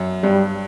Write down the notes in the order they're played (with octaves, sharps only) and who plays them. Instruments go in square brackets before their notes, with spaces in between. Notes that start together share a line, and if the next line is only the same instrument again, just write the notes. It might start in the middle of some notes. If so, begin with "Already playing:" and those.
Already playing: [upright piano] F#2
[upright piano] G2 [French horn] G3